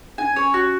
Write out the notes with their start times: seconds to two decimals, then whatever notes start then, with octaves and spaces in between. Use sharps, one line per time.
0.18 C#4 D#4 G#5
0.36 C#5
0.54 F#4